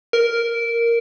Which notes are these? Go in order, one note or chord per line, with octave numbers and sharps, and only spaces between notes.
A#4